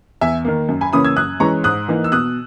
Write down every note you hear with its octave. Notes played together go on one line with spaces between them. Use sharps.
E2 E5 G#5
D#3 A#3
F#2
G#5 B5
C#3 E3 A#3 C#4 B5 D#6
E6 G#6
F#2 D#6 F#6
E3 G#3 C#4 A#5 C#6
G#2 D#6 F#6
E3 A#3 D#4
E6
B2 D#6 F#6